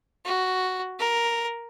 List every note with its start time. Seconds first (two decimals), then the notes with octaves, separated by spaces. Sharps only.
0.25 F#4
0.99 A#4